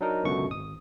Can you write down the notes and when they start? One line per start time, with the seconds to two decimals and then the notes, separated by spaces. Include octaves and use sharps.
0.01 F#3 D4 D#4 A#4
0.24 C#2 F#2 B2 D3 C#6
0.51 G#1 D#6